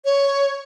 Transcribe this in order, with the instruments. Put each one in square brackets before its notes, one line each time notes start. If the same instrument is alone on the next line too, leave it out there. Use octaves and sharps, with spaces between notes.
[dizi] C#5